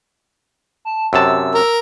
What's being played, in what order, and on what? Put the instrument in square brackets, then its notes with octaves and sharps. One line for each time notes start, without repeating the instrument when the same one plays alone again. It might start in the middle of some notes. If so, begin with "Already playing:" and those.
[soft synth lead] A5
[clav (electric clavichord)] F#2 C3 A5 [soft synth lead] E6
[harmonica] A#4